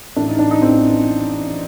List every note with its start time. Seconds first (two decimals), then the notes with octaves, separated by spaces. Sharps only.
0.16 A1 A2 E3 D4
0.28 D#4
0.39 D4
0.51 D#4
0.62 A1 A2 E3 C4